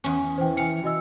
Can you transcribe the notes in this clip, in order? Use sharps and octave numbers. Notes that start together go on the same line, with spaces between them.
E2 C#4
E3 C5 G5
F5 G#5 C#7
F#4 D#5 E6